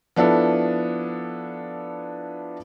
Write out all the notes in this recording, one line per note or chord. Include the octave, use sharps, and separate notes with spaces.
F3 B3 D4 E4 A4